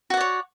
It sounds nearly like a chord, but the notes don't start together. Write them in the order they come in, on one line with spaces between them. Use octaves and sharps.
F#4 F#5 D5 C#5